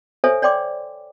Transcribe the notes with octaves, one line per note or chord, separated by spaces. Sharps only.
A4 C5 C#5 E5 G#5
C#5 D5 G5 C6 D6